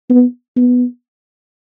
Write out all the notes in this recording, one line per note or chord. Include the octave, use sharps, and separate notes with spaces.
B3
B3